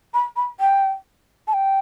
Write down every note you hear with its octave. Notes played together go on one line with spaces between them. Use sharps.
B5
B5
G5
A5
G5